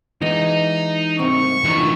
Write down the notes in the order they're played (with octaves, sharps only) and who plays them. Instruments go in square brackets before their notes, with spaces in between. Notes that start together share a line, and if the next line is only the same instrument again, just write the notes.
[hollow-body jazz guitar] E3 G#3 [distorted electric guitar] D#4 D#5
[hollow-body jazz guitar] C2 G#2 C4 [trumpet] C#6
[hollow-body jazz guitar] A#2 F3 D#4 [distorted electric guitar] E3 D4